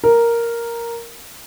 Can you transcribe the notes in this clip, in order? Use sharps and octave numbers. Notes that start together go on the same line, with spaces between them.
A#4